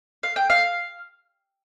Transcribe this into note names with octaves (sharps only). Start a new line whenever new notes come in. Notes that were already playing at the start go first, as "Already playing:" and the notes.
F5
G5
F5